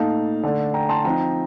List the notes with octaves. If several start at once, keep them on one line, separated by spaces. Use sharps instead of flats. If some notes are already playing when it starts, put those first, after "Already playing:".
Already playing: A#2 A3 D#4 F5 A5
D3 A3 D4
G5 A#5
A5 C6
F3 C4 D#4 G5 A#5